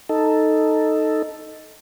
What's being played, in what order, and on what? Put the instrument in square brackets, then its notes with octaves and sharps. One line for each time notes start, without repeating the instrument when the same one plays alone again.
[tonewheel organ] D#4 A4